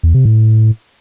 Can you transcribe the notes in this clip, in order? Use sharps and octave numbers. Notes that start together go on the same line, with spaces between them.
E2
C3
A2